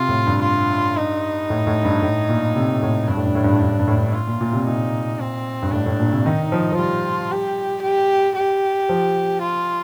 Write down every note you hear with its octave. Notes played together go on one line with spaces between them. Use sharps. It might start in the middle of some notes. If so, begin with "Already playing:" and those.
Already playing: C3 F4
A2
G2
F4
D#4
A2
A2
G2
A2
A#2
C3
A2
G2 D4
A2
G2
A2
G2
A2
G2
A2
G2
A2
G2
F4
A#2
A#2
C3
A#2 D#4
C4
G2
A2 D4
A2
A#2
C3
D#3 D#4
F3
F3
G3 F4
G4
G4
G4
F3
F4